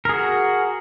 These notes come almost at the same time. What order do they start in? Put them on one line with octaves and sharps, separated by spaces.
A#4 G#4 F#4